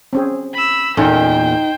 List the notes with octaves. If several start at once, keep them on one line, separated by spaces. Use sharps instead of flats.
C4 C#4 G#4
B5 E6
E2 A#2 C#4 D#4 A4 C5 G5